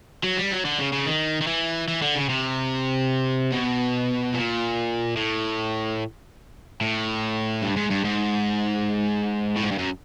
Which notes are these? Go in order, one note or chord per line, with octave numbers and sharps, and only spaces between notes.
F#3
G3
F#3
D3
C#3
C#3
D#3
D#3
E3
E3
D3
C#3
C3
B2
A#2
A2
A2
G2
G#2
G2
G#2
A2
G#2
G2
F#2